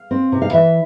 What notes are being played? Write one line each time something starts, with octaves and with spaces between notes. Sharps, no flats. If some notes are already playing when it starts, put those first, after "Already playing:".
Already playing: F5
C4
C3
F5
E3 E5